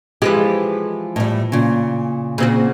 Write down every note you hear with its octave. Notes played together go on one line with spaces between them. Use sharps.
E3 F3 G#3 G4
A2 G3
A#2 C#3
A#2 C#3 C4 F#4